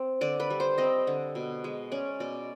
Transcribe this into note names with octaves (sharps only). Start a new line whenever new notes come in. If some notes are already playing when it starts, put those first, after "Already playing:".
Already playing: C4
D3 D5
B4
G3
C5
C4 D#5
D3
B2
G#3
C#4 D5
B2 D5